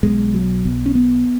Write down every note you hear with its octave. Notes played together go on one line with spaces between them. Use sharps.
B1 B2 G#3
F#3
B1 B2
C#4
B3